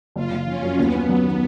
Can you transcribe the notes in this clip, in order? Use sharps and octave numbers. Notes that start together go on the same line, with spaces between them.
F#1 F4
F#1
F3 C#4
F#2
D#2 B3
C#4
F#3
D#3